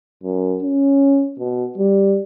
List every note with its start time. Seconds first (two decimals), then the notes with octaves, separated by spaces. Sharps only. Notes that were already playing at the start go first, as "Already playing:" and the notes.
0.23 F#2
0.62 C#4
1.39 B2
1.78 G3